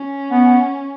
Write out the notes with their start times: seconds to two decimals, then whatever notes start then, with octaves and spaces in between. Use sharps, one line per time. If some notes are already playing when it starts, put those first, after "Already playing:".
Already playing: C#4
0.31 B3